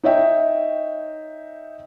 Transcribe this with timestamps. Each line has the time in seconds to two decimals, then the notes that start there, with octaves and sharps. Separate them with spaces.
0.03 D#4 C#5 D#5 E5 G5